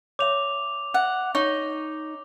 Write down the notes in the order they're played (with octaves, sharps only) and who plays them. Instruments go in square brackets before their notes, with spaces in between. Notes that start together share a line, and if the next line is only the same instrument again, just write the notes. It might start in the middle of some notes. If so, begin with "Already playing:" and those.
[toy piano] C#5 E5 [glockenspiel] D6 F7
[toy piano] E5 [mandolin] F#5
[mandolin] D#4 [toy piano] C#5 C#6